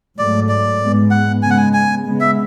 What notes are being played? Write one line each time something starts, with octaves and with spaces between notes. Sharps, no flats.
G#2 F#3 A3 D5
D5
G#2 G#3 B3
F#5
C#3 G#3 B3 G#5
F#5
G#5
G#5
C#3 G#3 B3
E5